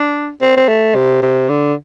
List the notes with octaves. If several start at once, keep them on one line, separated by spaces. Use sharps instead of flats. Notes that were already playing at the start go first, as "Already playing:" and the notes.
Already playing: D4
C4
C4
A3
C3
C3
D3